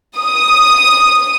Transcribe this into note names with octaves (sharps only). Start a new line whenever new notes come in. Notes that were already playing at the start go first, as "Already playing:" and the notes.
D#6